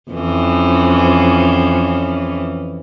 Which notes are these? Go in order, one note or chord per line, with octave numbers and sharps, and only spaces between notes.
F2 E3 C#4